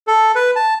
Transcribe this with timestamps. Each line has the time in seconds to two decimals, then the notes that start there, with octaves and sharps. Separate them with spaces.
0.07 A4
0.35 B4
0.56 A5